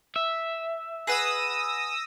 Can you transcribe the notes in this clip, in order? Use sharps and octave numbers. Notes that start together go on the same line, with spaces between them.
E5
G#4 B4 F#5 D#6 E6 A#6